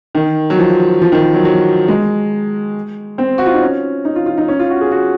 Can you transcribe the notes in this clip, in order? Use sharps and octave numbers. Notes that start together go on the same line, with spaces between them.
D#3
F#3
F3
F3
D#3
F#3
F#3
G#3
C4
F#4
F4
D#4
C#4
D#4
F4
F4
D#4
C#4
F4
F#4
G#4
F#4